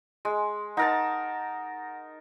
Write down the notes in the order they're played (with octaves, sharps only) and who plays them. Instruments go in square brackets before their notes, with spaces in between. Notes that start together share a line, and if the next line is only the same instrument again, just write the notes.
[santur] G#3
[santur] D#4 A#4 A5 [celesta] F#5 A#6